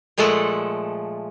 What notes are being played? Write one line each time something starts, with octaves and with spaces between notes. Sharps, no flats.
A#2 F3 G#3 A3 A4 F#5